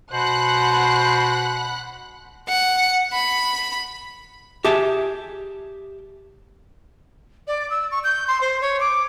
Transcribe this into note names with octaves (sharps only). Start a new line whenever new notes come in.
B2 C5 F#5 B5 F#6
F#5
B5
G4 G#4 E5 A5
D5
E6
C#6
G6
C6
C5
C#5
D6